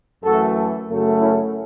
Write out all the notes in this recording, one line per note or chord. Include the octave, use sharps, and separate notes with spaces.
F#2 E3 A3 F#4 A4
F#2 C#3 F#3 A3
C#4 E4